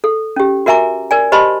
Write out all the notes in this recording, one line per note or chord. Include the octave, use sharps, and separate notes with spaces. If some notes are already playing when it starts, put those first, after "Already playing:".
A4
C#4 G4
F#4 A#4 E5 G#5 A#5 D6
A#4 D5 G#5
G4 C5 D#5 A5 B5 C6